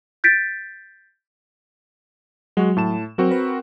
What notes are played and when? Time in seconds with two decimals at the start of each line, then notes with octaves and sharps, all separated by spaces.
0.24 G6 A6 B6 D7
2.57 F#3 G#3 F#4
2.77 A2 A5 E7
3.18 F#3 C4 F#4 A#4
3.31 B4